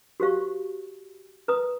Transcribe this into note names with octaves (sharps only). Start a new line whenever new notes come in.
F#4 G4 C5 F5 C#6
B4 A#5 D#6